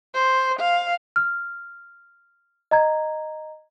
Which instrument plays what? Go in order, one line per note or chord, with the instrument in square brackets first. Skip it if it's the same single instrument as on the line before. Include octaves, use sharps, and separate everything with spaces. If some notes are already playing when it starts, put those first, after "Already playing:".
[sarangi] C5
F5
[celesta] F6
D#5 A#5 G#6